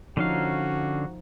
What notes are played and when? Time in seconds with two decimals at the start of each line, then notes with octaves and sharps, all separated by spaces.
0.17 D3 F3 C#4 D#4 F#4 F5